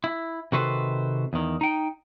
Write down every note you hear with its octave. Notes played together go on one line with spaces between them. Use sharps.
E4
C3 D#3 F#4 A4 B4 C5
E2 D#3
D#4 G5